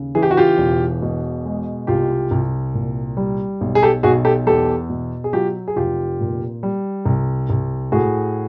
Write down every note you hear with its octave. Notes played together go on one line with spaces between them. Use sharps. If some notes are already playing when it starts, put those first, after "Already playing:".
Already playing: D#2 C#3
E3 G#4
G4
F#4
F4 G4
E1
B2
G#3
C2 F4 G4
C2
A#2
G3
B1
G#4
G4 A4
B1 F#4 G#4
G4 A4
E2 G4 A4
B2
G#4
F#3 F4 G4
G#4
F1 F4 G4
A#2
G3
C2
C2
A2 F#4 G#4